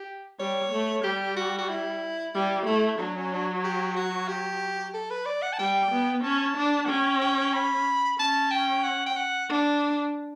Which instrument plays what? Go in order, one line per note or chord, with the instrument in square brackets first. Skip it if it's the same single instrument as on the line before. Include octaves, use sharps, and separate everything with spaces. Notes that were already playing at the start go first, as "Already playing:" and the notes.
Already playing: [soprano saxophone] G4
[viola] G3 [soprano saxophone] C#5
[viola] A3
[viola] G3 [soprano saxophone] G4
[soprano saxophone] F#4
F#4
E4
[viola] G3 [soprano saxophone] E4
[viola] A3 [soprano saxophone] E4
[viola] F#3 [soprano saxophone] D4
[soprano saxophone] C#4
D4
G4
F#4
G4
A4
B4
D5
F#5
A5
[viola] G3 [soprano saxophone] G5
[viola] B3
[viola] C#4 [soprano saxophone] A5
[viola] D4
[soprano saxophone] F#5
[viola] C#4 [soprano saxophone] G5
[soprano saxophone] G5
B5
[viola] C#4 [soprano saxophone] A5
[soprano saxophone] G5
F#5
G5
F#5
[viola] D4